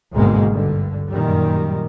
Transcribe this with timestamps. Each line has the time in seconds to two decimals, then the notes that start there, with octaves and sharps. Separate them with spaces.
0.14 G#1 D2 G#2 B2 G#3 A#3
0.50 G2 D3
1.11 F#2 A#2 D#3 G3